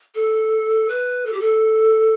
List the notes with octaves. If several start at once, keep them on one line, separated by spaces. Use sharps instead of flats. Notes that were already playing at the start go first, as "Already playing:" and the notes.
A4
B4
A4
G4
A4